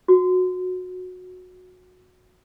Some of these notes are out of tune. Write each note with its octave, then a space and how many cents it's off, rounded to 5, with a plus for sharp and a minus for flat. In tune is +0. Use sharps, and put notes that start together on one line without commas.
F#4 -15